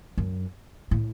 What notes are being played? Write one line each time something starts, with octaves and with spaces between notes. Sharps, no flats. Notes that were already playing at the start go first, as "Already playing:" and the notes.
F#2
A2